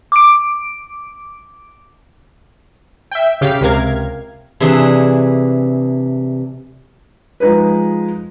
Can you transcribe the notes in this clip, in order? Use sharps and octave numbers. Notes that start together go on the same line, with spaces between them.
D6 D7
E5 G5
C#3 G4 F5 B6
C#2 C3 A#4 F5 G#6
C3 E3 D4 G#4 C6
F3 G#3 D#4 G#4 B4